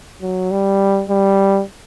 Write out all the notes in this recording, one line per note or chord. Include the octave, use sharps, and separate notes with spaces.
F#3
G3
G3